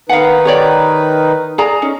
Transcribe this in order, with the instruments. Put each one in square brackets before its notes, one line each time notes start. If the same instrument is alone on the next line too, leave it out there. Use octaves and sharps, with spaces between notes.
[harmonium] D#3 D#4 B4 [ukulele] F5 F#5
[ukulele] G4 C#5 D5
G#4 D5 A#5
C#4 D#4